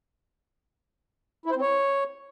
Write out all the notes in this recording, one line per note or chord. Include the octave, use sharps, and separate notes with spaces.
E4
C5
C4
C#5